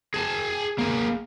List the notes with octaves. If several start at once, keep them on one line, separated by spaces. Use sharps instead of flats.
G#4 A5
A#3 G#4